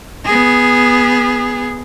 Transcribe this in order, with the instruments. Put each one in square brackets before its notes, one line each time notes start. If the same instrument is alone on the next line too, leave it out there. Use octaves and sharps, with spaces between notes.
[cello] B3 G#4